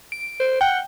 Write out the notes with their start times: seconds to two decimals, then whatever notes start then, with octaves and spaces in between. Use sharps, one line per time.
0.12 D7
0.40 C5
0.61 F#5 G5